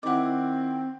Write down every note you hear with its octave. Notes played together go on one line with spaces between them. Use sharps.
D#3 C4 E4 D#5 F#5 D6 F#6